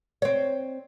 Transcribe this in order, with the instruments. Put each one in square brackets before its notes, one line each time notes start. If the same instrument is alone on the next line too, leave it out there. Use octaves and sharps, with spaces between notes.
[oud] C4 C#5